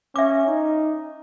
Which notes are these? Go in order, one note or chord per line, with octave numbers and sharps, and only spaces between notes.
C#4 E5 D6
D#4